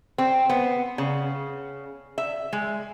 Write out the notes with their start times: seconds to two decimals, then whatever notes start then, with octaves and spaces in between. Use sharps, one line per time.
0.18 C4
0.49 B3
0.98 C#3
2.18 E5
2.53 G#3